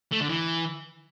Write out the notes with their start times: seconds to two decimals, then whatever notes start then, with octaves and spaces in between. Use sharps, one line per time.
0.12 A3
0.21 D3
0.29 E3